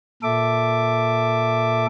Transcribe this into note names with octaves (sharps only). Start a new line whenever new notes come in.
A#2 A4 E5 D6